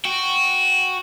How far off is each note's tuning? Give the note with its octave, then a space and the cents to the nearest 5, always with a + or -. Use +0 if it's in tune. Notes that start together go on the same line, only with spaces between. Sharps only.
F#4 +0 G5 +0